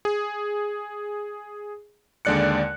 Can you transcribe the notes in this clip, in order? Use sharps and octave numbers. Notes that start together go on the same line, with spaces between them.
G#4
D#2 D3 G#3 D5 F#6 C#7